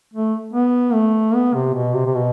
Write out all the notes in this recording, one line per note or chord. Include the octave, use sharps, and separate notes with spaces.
A3
B3
A3
B3
C3
B2
C3
C3
B2